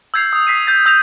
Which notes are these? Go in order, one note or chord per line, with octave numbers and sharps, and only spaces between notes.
E6 G6 G#6 C7 F7
D#6
D#6 B6 C7 D#7
G6 A6
E6 G6 A#6 F7